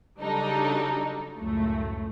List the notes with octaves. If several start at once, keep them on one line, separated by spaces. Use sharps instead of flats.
C#3 F#3 G3 D4 D#4 A4
C#2 F#2 A2 A3